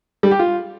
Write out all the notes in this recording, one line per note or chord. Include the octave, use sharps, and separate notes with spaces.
G3
G4
F4